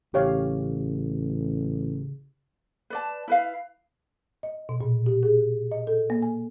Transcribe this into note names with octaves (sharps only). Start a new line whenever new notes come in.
A1 C#3 G4 C#5 F5
B4 D5 A5
E4 B4 F5
D#5
B2
A#2
G4
G#4
D#5
A4
A#3
G#5